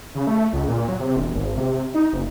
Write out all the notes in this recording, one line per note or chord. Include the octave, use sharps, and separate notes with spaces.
C#3
A3
C#2
A#2
F#3
C3
E1
G#1
C3
D#4
F#1